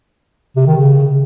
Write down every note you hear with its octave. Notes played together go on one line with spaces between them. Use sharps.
C3
D#3
C#3